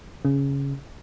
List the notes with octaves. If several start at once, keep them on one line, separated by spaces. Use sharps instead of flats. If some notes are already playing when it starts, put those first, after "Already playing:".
C#3